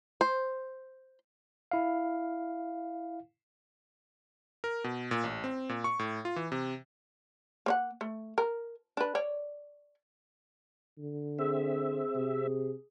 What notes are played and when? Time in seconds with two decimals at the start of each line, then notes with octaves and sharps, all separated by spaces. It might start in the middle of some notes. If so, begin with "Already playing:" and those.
0.21 C5
1.71 E4 F5
4.64 A#4
4.84 B2
5.11 A#2
5.24 A1
5.44 C4
5.69 A#2
5.84 C#6
5.99 A2
6.25 F4
6.36 E3
6.52 C3
7.66 A#3 C#5 F#5
8.01 A3
8.38 A#4
8.97 D4 B4
9.15 C#5 D5
10.98 D3
11.39 C4 G#4 E5
12.15 C3